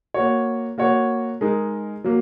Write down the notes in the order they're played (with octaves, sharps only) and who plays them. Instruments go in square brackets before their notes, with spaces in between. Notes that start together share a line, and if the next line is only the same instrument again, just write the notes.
[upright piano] A#3 F#4 C#5
A#3 F#4 C#5
G#3 D#4 A#4
F#3 A#3